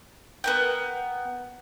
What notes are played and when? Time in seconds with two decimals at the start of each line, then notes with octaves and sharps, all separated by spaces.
0.44 B3 A#4 G5